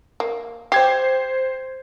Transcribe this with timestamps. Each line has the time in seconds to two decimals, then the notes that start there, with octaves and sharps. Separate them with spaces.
0.20 A#3
0.72 G4 C5 G#6 C7